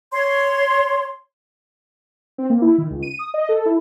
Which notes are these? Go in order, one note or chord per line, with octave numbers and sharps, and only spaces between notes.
C#5 C6
C4
A#3
E4
D#3
C#2
D#7
D#6
D#5
A4
E4